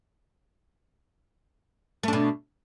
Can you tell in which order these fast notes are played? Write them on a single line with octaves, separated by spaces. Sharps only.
A3 D4 B2